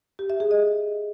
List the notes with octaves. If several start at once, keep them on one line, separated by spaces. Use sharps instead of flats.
G4
E5
G#4
D#5